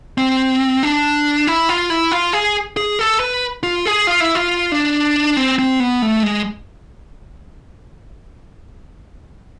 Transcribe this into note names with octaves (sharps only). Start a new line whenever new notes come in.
C4
D4
E4
F4
E4
F4
G#4
G#4
A4
B4
F4
G#4
F4
E4
F4
D4
C4
C4
B3
A3
G#3